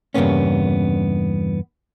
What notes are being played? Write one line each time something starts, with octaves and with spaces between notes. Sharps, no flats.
E2 G2 C#3 A#3 B3 C#4